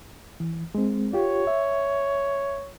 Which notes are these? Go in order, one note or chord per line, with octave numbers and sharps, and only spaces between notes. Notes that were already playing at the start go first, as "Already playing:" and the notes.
E3
G#3 C4
F4 G4 C#5
E5